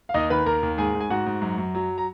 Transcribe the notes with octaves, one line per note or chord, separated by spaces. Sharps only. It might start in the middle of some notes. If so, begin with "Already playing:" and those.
F5
D#2 D#4 D#5
D#3 B4 B5
D#2 A#4 A#5
D#2
G#2 G#4 G#5
G#2
G#5
G#2 F#4 F#5
G#2
F#2
F#2
F#3
A#5